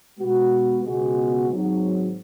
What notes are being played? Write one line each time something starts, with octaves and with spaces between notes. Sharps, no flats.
B2 G#3 B3 F#4
C#2 B2 G#3 B3 F#4
G#1 G#2 F#3